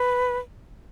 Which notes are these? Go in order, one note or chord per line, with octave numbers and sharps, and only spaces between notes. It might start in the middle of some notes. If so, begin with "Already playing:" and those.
Already playing: B4